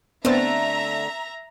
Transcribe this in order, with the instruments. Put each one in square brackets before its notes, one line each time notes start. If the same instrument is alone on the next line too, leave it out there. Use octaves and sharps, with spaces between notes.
[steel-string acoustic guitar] D3 A3 [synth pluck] B3 C4 A6 [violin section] E5 A#5